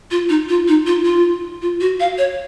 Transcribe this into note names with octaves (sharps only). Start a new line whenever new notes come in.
F4
D#4
F4
D#4
F4
F4
F4
F#4
F5
C#5